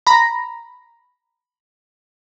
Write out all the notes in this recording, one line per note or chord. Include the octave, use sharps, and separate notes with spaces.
A#5 B5 A#6